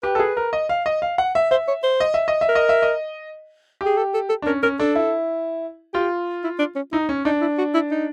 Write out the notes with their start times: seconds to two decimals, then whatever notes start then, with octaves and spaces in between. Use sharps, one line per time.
0.03 G4 B4
0.15 A4
0.19 G#4
0.37 A#4
0.53 D#5
0.69 F5
0.86 D#5
1.02 F5
1.18 F#5
1.35 E5
1.51 C5 E5
1.68 C#5
1.83 C5
2.00 D#5
2.14 E5
2.28 D#5
2.41 E5
2.49 A#4
2.55 D#5
2.69 E5
2.82 D#5
3.81 G4
3.86 G#4
3.98 A4
4.14 A4
4.30 A4
4.42 D4
4.47 C#4 A#4
4.63 C#4 A#4
4.80 D4 A4
4.95 E4
5.94 F4 G4
6.44 E4
6.59 D4
6.76 C#4
6.92 D#4 E4
7.09 C#4
7.25 D4 D#4
7.41 E4
7.58 F#4
7.74 E4
7.91 D#4